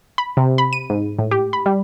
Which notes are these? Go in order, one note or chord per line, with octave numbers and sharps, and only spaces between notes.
B5
C3
B5
D#7
G#2
A2
G4
B5
G3